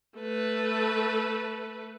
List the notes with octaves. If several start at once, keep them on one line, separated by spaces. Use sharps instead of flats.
A3 B4